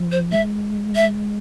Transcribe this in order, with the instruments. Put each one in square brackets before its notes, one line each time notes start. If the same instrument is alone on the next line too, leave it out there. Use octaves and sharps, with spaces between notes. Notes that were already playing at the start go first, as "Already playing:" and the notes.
Already playing: [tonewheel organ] F3
[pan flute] C5
[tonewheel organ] G#3 [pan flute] E5
[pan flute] E5